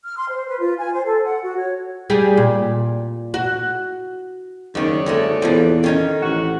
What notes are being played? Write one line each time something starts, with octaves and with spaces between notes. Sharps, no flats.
F6
C6
C5
B4
F4
G#5
C5
A4
F#5
F#4
C#5
G3 G4 G#4
A#2
F#4
F#1 D#2 D#3 D#4 C#5 D5
D2 G#3 A3 A4
E2 A#2 E3 F3
D#3 C#4 D#4
A1 C3 F#4